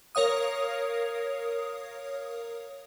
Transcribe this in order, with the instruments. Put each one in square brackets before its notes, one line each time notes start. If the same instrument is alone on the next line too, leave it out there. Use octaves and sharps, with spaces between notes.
[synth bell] A#4 C#5 F5 D#6